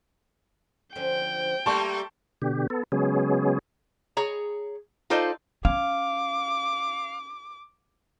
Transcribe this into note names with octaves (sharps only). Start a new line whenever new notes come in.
D3 F3 C#4 G5
G3 A3 A#3 D5 A5 C6 C#6
B2 D3 G4
B3 A4
C#3 F#3 G#3 B3 C#4 G#4
G#4 C#5 A#5
D#4 F4 A4 C5 D5
C#4 F5 D6